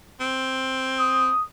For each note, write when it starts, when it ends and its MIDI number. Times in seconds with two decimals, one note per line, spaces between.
0.20 1.31 60
0.99 1.41 87